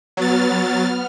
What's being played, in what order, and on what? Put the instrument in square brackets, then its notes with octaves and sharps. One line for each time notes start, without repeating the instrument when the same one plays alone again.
[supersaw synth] F#3 A6 [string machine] B3 F6